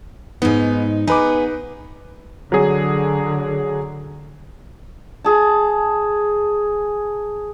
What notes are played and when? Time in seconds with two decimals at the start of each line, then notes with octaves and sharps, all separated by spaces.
0.42 G#2 B3 D#4
1.07 B3 D#4 G#4 B4 D6
2.52 D3 F#3 G#4
5.24 G#4 A5